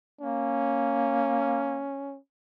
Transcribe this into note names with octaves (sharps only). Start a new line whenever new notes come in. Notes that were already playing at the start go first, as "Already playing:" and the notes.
A#3 C#4